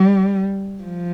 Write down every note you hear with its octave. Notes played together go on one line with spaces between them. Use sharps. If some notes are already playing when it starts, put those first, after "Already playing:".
Already playing: G3
F3